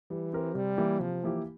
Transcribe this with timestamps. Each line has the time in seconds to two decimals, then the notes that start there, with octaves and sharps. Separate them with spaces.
0.10 E3 G3
0.33 C4 G4 A#4
0.55 C3 G3
0.78 E3 A#3 E4 G4
1.00 C3 F3
1.23 E3 A#3 E4 G4